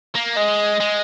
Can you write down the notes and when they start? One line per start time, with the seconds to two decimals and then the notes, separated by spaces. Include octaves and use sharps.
0.15 A#3
0.37 G#3 D#5
0.80 G#3